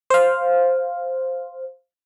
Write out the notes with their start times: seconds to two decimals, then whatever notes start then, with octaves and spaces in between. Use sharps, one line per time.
0.10 C5 F5